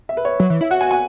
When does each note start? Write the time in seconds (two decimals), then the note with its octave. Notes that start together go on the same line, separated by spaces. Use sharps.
0.09 E5
0.17 B4
0.25 C#5
0.40 F#3
0.50 E3
0.61 E4 E5
0.71 F#4 F#5
0.81 G#5
0.91 G#5